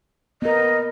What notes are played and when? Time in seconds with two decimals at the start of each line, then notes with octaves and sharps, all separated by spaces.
0.42 B3 A#4 D#5